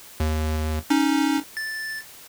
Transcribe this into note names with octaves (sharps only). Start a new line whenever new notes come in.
D#2
C#4 D#4
A6